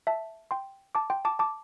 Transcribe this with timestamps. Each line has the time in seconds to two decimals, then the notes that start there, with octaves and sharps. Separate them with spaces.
0.07 E5 A5
0.51 G5 C6
0.95 A5 D6
1.10 G5 C6
1.25 A5 D6
1.39 A5 D6